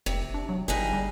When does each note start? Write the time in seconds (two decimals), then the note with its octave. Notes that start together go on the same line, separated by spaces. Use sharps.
0.06 F1 C3
0.34 D4
0.49 F#3
0.68 G1 G2 D#4 G#4
0.93 G3